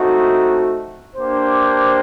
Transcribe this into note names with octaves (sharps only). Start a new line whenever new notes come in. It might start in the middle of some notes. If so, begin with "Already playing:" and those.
Already playing: A3 C4 D#4 F#4
A#3 D4 G4 C5